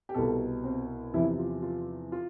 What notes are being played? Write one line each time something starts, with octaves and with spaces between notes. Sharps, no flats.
G4
C2 B2 A4
C4
E2 C3 F3 E4
F4
F4
F4